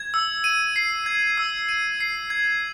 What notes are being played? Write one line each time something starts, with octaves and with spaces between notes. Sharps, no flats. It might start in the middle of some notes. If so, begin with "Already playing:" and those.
Already playing: G#6
E6
D#7
C7
G#6
E6
D#7
C7
G#6